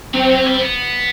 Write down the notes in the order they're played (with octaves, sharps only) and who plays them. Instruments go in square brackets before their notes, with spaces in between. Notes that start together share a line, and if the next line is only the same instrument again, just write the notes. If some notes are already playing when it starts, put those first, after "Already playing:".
[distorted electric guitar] F#3 [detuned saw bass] C4
[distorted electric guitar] F#3
G3
B3